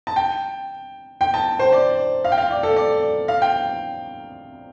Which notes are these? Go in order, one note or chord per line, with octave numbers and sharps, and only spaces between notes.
A5
G5
G5
A5
C5
D5
F5
G5
F5
D5
A4
D5
F5
G5